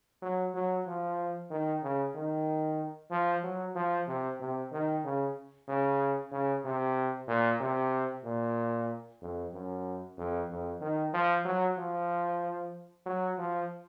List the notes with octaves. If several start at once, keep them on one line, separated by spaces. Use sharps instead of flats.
F#3
F#3
F3
D#3
C#3
D#3
F3
F#3
F3
C3
C3
D#3
C#3
C#3
C#3
C3
A#2
C3
A#2
F2
F#2
F2
F2
D#3
F3
F#3
F3
F#3
F3